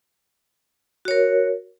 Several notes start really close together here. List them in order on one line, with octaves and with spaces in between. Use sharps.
F#4 C#5 A#4